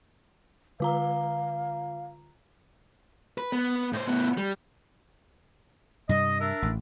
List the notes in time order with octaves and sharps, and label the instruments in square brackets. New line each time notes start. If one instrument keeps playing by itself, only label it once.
[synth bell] D3 F4 A#5 [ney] F5
[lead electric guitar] B4
B3
A2 C5
A2 B3
G3
[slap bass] G2 C3 G3 [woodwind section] D#5
[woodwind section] D4 A#4 E5
[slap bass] A1 A2